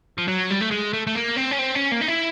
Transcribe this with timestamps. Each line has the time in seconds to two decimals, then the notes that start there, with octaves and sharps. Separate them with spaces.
0.18 F3
0.28 F#3
0.50 G3
0.61 A3
0.71 G#3
0.93 A3
1.07 A3
1.15 A#3
1.36 C4
1.51 C#4
1.59 C4
1.75 C#4
1.92 A#3
2.01 D#4
2.08 E4